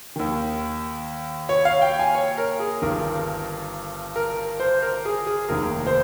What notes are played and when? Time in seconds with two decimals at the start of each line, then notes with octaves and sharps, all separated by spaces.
0.16 D#2 D#3
1.49 C#5
1.65 F5
1.82 G5
1.99 G#5
2.15 C#5
2.38 A#4
2.60 G#4
2.82 G1 G2 D#3 A#4
4.16 A#4
4.60 C5
4.82 A#4
5.05 G#4
5.26 G#4
5.49 F1 D#2 D#3 A#4
5.87 C5